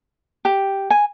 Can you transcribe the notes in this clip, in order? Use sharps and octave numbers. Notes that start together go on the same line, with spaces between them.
G4
G#5